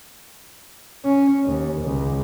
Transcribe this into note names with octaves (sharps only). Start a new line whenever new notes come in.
C#4
D#2
C#2